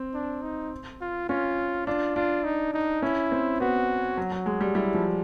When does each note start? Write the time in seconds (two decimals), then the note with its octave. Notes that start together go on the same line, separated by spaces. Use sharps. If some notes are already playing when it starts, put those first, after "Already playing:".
Already playing: C4
0.14 D4
0.42 D#4
1.01 F4
1.29 C#4 F4
1.87 D4 F4
2.16 D4 F4
2.44 D#4
2.74 D#4
3.02 C#4 E4
3.32 C4
3.60 B3 F#4
4.17 F#3
4.32 F#3
4.46 G#3
4.61 G3
4.75 G3 E4
4.94 F3